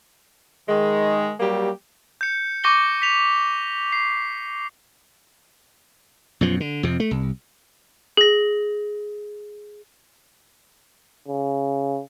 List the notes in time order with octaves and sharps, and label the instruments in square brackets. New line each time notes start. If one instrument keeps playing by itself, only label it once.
[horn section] D#3 G#3
F#3 G3 A#3 G4
[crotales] G6 C#7
C#6 D6 G6 A#6 C#7 G7
B6 F7
C7
[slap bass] F#2 B2 F3
D3
F2 C3
A3
C2
[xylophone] G#4 A#6
[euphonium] C#3